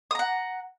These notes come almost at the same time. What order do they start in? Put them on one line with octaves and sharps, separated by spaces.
D#6 A#5 F#5